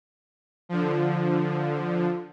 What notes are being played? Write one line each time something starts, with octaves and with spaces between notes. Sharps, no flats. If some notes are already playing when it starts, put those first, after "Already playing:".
D3 F3